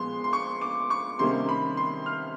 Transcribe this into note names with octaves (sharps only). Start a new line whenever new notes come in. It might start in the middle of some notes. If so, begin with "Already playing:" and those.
Already playing: A#2 F3 G#3 B3 C6
C6
C#6
D6
C#6
C3 D#3 G3 A#3 C#4 C6
B5
C6
F6